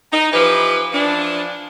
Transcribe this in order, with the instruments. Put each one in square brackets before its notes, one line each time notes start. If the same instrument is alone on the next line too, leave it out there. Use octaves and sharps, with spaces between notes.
[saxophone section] D#4
E3 F3 G4 B4
E3 F3 D4